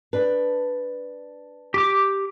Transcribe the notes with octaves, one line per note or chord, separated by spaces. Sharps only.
D4 B4
G4 D6